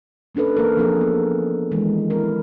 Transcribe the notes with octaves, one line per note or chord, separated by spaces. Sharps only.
A#3 C#4 D4 A4 B4
E3 A#3 A#4
F3 C4 D4 G#4 A4
B3
D#3 E3 G#3
C4 E4 A#4